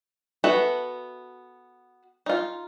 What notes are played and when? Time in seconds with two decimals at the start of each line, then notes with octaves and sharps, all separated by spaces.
0.44 B3 F#4 A4 E5
2.26 D#4 F4